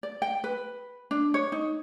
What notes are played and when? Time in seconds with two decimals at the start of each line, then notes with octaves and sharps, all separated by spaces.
0.03 D5
0.22 G5
0.44 B4
1.11 D4
1.34 C#5
1.52 D#4